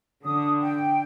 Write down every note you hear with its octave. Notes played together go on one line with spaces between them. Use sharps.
D3 D#6
G5